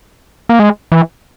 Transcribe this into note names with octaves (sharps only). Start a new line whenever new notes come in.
A#3
G#3
E3